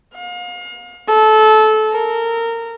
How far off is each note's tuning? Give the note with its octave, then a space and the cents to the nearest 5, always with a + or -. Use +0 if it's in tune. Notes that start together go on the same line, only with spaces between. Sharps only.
F5 +35
A4 -25
A#4 -20